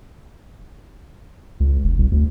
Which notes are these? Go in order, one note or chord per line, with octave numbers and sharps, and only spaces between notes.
C#2
E1
C2
D2